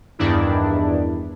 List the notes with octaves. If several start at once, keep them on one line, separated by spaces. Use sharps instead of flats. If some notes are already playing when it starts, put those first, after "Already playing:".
E2 G2 D#3 D4 E4